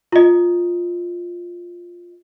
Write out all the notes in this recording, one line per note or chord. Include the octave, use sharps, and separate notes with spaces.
F4 D#5